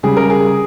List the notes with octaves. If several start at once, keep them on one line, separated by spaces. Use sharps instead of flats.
C#3 G3 G#4
A#4
G#4